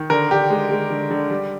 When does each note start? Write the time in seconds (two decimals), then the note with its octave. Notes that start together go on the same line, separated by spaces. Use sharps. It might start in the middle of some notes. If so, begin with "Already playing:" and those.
Already playing: D#3
0.10 D3 A#4
0.31 D3 G4
0.50 G#3
0.71 G#3
0.90 D3
1.11 D3
1.30 G3